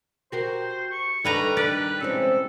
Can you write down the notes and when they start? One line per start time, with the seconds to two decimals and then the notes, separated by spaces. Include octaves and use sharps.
0.32 F#4 G4 A#4 C5
0.91 C#6
1.25 G2 D#3 G3 D4 D#4 A4 B4 A#5
1.57 D#3 D4 B4 D5
2.00 C3 E3 G3 G#3 C4 C#4 A4